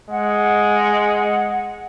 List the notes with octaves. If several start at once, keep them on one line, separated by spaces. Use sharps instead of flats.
G#3 F#5